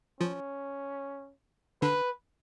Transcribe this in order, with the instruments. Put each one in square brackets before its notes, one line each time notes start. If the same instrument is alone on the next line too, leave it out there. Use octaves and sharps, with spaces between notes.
[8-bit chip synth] F3 F4 [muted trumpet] C#4
[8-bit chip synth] D3 D4 [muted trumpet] B4